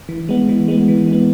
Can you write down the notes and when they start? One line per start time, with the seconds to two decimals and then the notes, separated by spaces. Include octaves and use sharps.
0.09 E3
0.29 G#3 B3
0.49 E3
0.68 G#3 B3
0.88 E3
1.08 G#3 B3